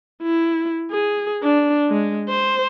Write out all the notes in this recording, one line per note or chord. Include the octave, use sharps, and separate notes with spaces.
E4
G#4
D4
G#3
C5